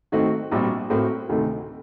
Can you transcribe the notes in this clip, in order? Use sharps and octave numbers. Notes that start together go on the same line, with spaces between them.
D#3 A3 C4 D#4 F#4
A#1 A#2 G3 C4 F#4
A2 A3 C4 F#4 A#4
D2 C3 D#3 A3